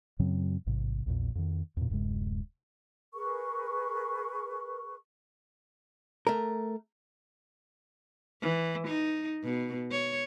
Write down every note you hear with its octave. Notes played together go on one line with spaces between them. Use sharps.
F#2 C#3 F#3 C4
A1 G#2 C3
A#1 E2 A#2
F2 D#3
E2 A#2
D1 F#2 C3 G#3
G#4 A#4 B4 C#6
A3 A#4
E3
D#4
B2
C#5